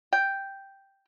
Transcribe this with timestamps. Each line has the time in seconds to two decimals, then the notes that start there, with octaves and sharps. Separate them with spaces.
0.13 G5